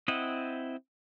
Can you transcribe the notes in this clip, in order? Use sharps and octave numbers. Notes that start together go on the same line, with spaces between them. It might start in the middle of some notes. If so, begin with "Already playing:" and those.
C4 E4 D#5 F#5